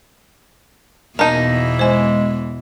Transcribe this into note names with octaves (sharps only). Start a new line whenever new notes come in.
E2 B2 E3 A#3 D#4 A5
G#3 C5 G#5